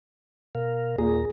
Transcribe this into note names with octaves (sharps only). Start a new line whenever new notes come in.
B2 A#4 F5
D#2 A#2 A#3 G#4 A#5